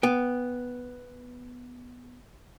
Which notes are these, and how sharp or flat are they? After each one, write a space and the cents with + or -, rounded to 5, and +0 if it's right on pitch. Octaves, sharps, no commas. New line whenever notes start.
B3 +0 G5 +20